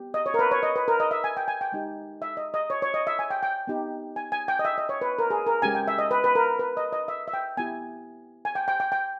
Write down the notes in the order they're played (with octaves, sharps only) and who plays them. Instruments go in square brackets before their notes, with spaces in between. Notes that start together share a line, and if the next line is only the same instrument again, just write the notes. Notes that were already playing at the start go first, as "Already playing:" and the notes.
Already playing: [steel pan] B3 G4
D#5
C#5
A#4
B4
C#5
D#5
B4
A#4
D#5
E5
G#5
G5
G#5
G5
G#3 D#4 G4
E5
D#5
D#5
C#5
C#5
D#5
E5
G#5
G5
G5
B3 D#4 G4
G#5
G#5
G5
D#5
E5
D#5
C#5
B4
A#4
G#4
A#4
G#3 C#4 G4 G#5
G5
E5
D#5
B4
B4
A#4
B4
D#5
D#5
E5
E5
G5
B3 E4 G4 G#5
G#5
G5
G5
G5
G5